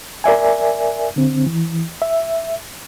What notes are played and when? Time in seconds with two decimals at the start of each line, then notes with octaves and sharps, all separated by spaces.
0.24 A#4 D5 E5 G#5
1.16 D3 C4
1.46 E3
2.02 E5